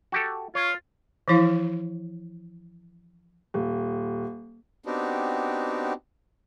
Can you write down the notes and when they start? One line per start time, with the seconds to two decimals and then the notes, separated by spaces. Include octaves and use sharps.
0.12 F#4 G4 A4
0.55 F4 C#5
1.28 E3 F3 E4 F5
3.54 D#1
4.86 B3 C4 D4 D#4 F#4 G4